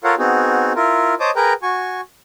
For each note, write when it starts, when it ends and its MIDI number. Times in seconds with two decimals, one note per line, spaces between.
0.04 0.15 65
0.04 0.15 69
0.04 0.15 70
0.04 0.15 73
0.04 0.15 77
0.04 0.15 78
0.18 0.73 59
0.18 0.73 60
0.18 0.73 63
0.18 0.73 66
0.18 0.73 68
0.76 1.15 64
0.76 1.15 65
0.76 1.15 70
1.20 1.31 72
1.20 1.31 73
1.20 1.31 75
1.20 1.31 81
1.20 1.31 86
1.20 1.31 87
1.36 1.53 68
1.36 1.53 70
1.36 1.53 71
1.36 1.53 79
1.36 1.53 82
1.63 2.01 66
1.63 2.01 80
1.63 2.01 85